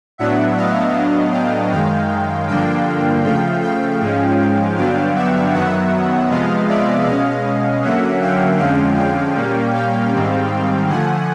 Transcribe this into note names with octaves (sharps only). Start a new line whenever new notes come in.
A2 F#3 B3 D4 E5 F#5
D#5 F5
A2 F#3 B3 D4
F5 G5
F#2 D#3 G#3 F5 G5
G2 D3 F3 A#3 D4 F5 G5
C#3 F3 A3 F5 G5
F5 G5
G#2 F3 G#3 C#4
G2 D3 F#3 B3 D4 F5 G5
E5 F#5
F#2 D#3 F#3 B3 E5 F#5
C3 F3 G#3 B3 D#5 F5
D5 E5
B2 G#3 C#4 D#5 F5
D3 F#3 A#3 C#4 E5 F#5
F5 G5
F2 D3 F3 G#3 C#4 F5 G5
F5 G5
A#2 G3 A#3 C#4
F5 G5
G#2 D#3 G3 C4
D3 F3 A3 F#5 G#5